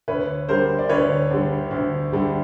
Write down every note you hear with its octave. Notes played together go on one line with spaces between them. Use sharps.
D2 B4 C#5
D3 G3 A#4 C5
D5
D2 B4 C#5
D3 G3
D2
D3 G3